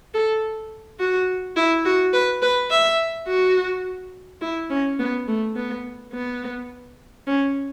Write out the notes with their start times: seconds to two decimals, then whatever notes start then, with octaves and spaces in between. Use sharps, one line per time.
0.14 A4
0.99 F#4
1.57 E4
1.85 F#4
2.14 B4
2.42 B4
2.71 E5
3.28 F#4
4.42 E4
4.70 C#4
4.99 B3
5.28 A3
5.56 B3
6.13 B3
7.27 C#4